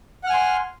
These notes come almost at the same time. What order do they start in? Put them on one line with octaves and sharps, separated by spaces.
F#5 F6 G#5 C6